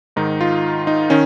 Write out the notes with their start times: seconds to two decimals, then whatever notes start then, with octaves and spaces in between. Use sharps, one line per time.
0.16 G#2 D#3 D#4
0.41 F4
0.87 D#4
1.10 D#3 C#4